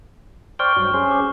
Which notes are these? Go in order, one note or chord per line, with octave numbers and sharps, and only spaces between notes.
C5 D5 G5 C#6 F6 G7
G2 F#3
C#4 G#4 C5
D6